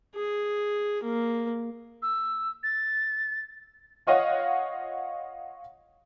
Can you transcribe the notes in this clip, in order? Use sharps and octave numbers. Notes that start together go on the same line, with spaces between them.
G#4
A#3
E6
A6
F4 C#5 D#5 F5 F#5